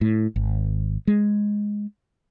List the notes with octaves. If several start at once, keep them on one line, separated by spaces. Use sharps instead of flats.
A2
G#1
G#3